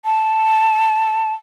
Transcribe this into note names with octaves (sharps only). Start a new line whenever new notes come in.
A5